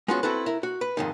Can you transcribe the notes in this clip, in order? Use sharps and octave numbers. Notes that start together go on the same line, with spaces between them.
G#3 B3 C#4 F4 F#4
C4 E4 F#4 A4 B4
E4 A#4
F#4
B4
F2 G#2 D#3